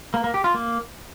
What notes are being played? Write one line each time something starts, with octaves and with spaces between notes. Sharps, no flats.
A#3
A#3
G4
F4
A#3